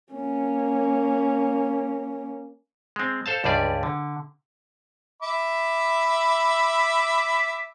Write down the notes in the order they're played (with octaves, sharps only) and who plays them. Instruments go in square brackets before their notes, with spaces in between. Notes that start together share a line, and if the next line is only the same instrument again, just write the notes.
[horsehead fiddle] A#3 C#4
[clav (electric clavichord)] G#3 C4
A4 C5 F5 A5
C#2 G2 G3 G#4 D5
D3
[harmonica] E5 B5 D6